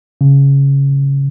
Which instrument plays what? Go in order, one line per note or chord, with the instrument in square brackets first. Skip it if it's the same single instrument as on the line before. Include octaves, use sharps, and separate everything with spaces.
[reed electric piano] C#3